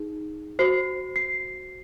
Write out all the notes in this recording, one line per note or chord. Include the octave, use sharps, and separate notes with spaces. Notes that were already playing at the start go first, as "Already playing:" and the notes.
Already playing: D#4 G#4
F#4 C5 C7
C7